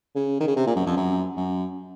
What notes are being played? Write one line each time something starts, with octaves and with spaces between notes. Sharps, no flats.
C#3
D#3
C#3
C3
A#2
F#2
F2
F#2
F#2